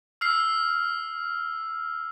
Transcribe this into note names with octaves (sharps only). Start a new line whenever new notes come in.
E6 F6 C7